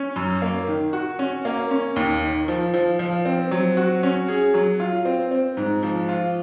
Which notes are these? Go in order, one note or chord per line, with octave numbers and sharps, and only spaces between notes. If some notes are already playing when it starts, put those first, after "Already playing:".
Already playing: C#4
F#2
A#3
D#3
F#4
C#4
A#3
C#4
D#2
D#3
F3
F3
F3
C4
F#3
F#4
C#4
G#4
F#3
F4
C4
C4
G#2
F3
F4